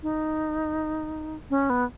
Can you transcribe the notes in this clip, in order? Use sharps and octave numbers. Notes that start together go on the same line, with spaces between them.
D#4
C#4
B3